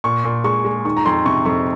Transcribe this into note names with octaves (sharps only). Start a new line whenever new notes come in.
A#2 C#6
A#2
G#3 C#6
G#3
D#3 C#6
A#5
F2 C6
C3 C#6
F2 C#6